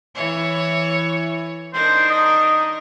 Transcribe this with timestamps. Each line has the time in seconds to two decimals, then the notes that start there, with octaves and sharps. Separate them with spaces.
0.15 E3 E4 C#5
1.74 D4 D#4 A#4 C5
2.10 D#5